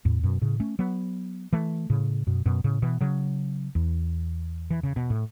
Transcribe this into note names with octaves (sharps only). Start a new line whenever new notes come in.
E2 A2
F#2 B2
A2 C#3
A3 C#4
F#3 B3
E3 A3
A2 C#3
F#2 B2
F#2 B2
A2 C#3
B2 E3
C#3 F#3
E2
E3
C#3
B2
A2